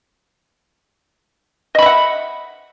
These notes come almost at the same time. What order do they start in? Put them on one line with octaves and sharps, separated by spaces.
D#5 B5 E5 F#5